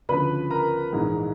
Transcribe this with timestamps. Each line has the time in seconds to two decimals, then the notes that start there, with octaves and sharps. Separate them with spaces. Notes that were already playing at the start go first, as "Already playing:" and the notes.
0.09 D2 C#3 F3 B4 B5
0.51 A#4 A#5
0.92 A#1 G#2 E3 G#3